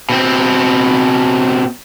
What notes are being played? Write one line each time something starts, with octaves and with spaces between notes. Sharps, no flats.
B2 C4